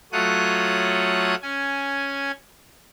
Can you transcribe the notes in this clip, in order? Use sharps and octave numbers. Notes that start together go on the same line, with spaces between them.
F#3 A3 F4 C#5 D#6 F#6
C#4 G#5